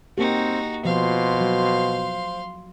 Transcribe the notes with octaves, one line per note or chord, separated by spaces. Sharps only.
A#3 C4 D#4 F#4 G4
B2 F3 C5 F5 C6
F#3